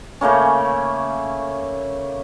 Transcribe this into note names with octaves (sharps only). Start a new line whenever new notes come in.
C#3 A3 A#3 C#4